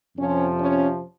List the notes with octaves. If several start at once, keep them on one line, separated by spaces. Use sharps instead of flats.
F2 C3 F3 C#4
C#4